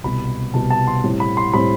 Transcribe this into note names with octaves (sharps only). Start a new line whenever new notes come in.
C2 B2 G3 B5
C2 B2 G3 A5
A5
C6
A2 G3 C4
B5
C6
A2 G3 C4 B5